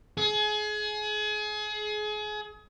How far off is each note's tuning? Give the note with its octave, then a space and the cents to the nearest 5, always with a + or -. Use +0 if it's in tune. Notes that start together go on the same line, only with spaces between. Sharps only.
G#4 +30